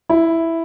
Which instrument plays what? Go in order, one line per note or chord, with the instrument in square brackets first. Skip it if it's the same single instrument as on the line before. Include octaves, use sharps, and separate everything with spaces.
[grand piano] E4